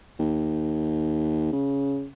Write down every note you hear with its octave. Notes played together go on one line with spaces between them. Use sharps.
D#2
C#3